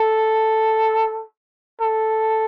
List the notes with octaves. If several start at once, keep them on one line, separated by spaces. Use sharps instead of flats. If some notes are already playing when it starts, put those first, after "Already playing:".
Already playing: A4
A4